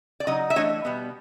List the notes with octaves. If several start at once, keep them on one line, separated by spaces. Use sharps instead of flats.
D5
C#3 F#3 D#4 D#5
E5
E3 A3 D4 C#5 D#5
B2 G3 B3